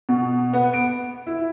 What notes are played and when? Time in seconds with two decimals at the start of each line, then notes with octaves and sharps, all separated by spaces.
0.09 B2
0.53 B3
0.73 D7
1.27 E4